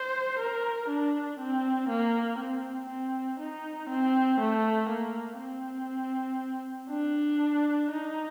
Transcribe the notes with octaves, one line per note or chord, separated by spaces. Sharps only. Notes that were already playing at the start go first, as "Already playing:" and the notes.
Already playing: C5
A#4
D4
C4
A#3
C4
C4
D#4
C4
A3
A#3
C4
D4
D#4